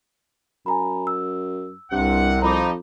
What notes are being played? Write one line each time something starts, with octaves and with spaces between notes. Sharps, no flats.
F#2 G#5 A#5 B5
E6
C2 G2 C3 F#5
F2 F3 D#4 A#5 B5 D6